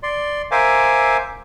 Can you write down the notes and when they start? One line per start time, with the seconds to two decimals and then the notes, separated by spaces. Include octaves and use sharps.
0.03 D5 C6
0.51 A#4 C5 E5 F5 G#5 D6